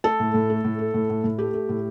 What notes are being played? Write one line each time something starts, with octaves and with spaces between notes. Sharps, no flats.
A3 A4
A2
A2
A3
A2
A3
A2
A2
A2
A3 G4
A3
A2